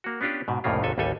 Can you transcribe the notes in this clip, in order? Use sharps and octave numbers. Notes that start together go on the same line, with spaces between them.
A#3 F#4
B3 C#4 D4 F4 G4 B4
G#2 B2
C2 F2 A2 C#3 A#3 F4
G#1 D#2 C3 A4 G#5
A1 D#2 G3 A4 C#5 G#5